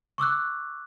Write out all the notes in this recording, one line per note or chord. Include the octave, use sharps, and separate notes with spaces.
C#6 D6 E6 F#6